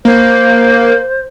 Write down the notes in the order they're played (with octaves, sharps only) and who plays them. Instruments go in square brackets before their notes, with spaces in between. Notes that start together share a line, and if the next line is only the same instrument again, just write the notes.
[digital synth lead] A#3 [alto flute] C5